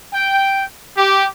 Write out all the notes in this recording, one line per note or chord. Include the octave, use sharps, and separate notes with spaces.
G5
G4